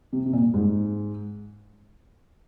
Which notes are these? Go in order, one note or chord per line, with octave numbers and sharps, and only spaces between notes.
C3
C3
A#2
G#2